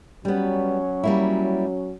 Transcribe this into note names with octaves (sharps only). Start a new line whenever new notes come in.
F#3 G3 B3 C#4
G3 A#3 E4